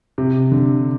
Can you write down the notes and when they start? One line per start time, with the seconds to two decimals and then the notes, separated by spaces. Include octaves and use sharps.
0.18 C3
0.52 D3